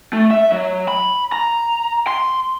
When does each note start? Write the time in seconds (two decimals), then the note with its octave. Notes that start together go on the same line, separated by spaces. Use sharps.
0.13 A3
0.31 E5
0.52 F#3
0.88 B5
1.32 A#5
2.07 C6